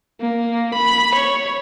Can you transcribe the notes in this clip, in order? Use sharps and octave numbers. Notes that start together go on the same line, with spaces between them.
A#3
B5
C#5